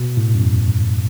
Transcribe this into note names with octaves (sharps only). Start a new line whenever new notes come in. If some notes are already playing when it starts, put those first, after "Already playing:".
Already playing: B2
A2
F#2
E2